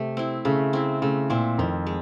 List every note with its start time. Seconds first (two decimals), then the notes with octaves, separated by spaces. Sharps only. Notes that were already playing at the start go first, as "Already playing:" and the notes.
Already playing: C3 A3
0.17 C4 E4
0.45 C#3 A3
0.73 C4 E4
1.02 C#3 A3
1.30 A#2 C4 E4
1.58 F2 D#3
1.87 G#3